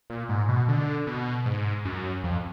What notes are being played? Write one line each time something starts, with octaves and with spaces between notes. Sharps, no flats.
A#2
G#2
B2
D3
B2
G#2
F#2
F2